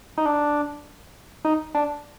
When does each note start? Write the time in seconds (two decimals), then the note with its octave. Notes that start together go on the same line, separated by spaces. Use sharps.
0.18 D#4
0.26 D4
1.45 D#4
1.75 D4